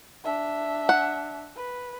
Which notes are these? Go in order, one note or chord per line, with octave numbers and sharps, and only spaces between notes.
D4 E5
F#5
B4